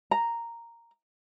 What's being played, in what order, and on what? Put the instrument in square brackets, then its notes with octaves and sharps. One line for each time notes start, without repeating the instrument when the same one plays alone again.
[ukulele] A#5